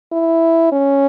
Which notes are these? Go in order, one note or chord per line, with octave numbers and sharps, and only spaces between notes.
E4
C#4